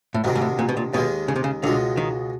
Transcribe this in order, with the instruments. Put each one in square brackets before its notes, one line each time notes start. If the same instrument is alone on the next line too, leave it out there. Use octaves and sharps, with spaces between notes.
[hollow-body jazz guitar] A2
[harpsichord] D2 C3 D#3 [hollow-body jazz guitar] G#2
[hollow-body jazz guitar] G#2
A2
A#2
B2
A#2
[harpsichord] D#2 D#3 G#3 [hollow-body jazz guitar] B2
[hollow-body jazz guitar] C#3
C3
C#3
[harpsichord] C#2 B2 G#3 [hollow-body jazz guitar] D3
[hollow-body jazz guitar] D#3